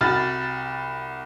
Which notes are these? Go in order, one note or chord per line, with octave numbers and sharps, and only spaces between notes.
C2 F#4 B5 F6 A6